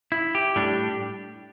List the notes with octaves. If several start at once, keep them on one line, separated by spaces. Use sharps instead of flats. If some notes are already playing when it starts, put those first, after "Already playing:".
E4
G4
A2 G3 D4